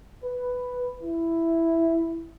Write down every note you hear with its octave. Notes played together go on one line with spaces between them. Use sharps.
B4
E4